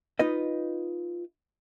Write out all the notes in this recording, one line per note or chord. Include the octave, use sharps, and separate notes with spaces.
D#4 F4 B4 D#5